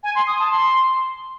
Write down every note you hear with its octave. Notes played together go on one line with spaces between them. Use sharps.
G#5
C6
D#6
A5
C6